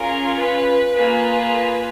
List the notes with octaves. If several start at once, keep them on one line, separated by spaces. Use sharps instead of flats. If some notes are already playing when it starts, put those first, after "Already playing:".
Already playing: C#4 F4 G#4 A#4
B4
A#3 F4 G#4 B4